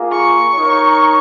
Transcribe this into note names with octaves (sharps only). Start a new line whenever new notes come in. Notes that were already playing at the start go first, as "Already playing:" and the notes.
Already playing: A#3 F4 G#4
C#6
D#4 A#4 C#5